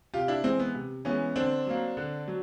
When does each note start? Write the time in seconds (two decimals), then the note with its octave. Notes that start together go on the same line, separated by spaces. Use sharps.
0.14 C3 F4 G4
0.28 D4 E4
0.44 E3 G#3 C4
0.59 B3
0.74 C3
1.05 E3 G#3 B3 C#4
1.36 D3 C4 D4
1.67 F#3 A#3
1.97 D3
2.28 F#3